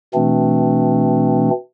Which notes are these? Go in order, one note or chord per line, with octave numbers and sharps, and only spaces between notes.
B2 E3 A3 C4 D4